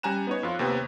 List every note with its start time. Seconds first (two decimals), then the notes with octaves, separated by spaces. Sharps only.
0.03 G3 C#4 G#5 A#5 F#6 E7
0.27 B3 D#4 C#5
0.43 F2 F4
0.59 D#2 C3 B3